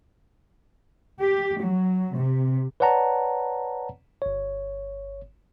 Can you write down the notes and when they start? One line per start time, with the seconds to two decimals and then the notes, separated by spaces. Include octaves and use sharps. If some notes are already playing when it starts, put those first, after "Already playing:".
1.20 G4
1.62 F#3
2.15 C3
2.80 B4 C#5 D5 F#5 A5 A#5
4.22 G1 C#5